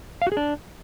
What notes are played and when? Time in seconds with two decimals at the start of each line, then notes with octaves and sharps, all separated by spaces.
0.22 F5
0.27 F#4
0.32 G#4
0.37 D4